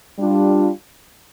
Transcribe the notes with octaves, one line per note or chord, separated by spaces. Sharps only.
G3 D4 F4